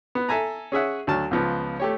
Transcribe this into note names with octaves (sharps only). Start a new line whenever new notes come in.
B3
A4 E5 G#5 A#5
C#4 G#4 E5 F#5
D2 F#3 A5 F6
C#2 F3 B3
A3 G4 C#5